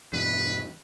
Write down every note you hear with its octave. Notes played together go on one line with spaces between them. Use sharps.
E2 G2 B2 B4